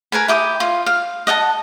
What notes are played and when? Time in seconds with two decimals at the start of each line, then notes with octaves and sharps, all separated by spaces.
0.12 A#4 B4 G#5 B5
0.28 E4 G4 D#6
0.60 F4
0.86 F5
1.27 D#5 F#5 G#5 A5